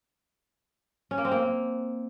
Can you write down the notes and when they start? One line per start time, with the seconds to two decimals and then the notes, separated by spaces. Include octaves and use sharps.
1.11 C#4
1.18 A#3
1.25 C4
1.32 A#3